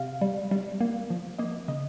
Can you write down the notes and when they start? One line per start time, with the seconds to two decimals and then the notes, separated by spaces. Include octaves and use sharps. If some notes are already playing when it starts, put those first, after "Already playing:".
Already playing: C3 F5
0.21 G3
0.51 G3
0.81 A#3
1.10 F3
1.39 A#3 D#5
1.68 C#3 D#5